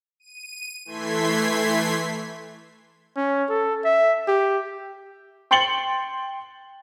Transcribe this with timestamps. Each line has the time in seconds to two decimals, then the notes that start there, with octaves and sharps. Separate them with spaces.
0.20 D#7
0.85 E3 A3 C6 G#6 B6 C7
3.16 C#4
3.49 A4
3.84 E5
4.28 G4
5.51 G5 C6 A6 C#7 F#7 G7